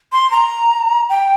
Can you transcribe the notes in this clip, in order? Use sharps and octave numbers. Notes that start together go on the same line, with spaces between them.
C6
A#5
G5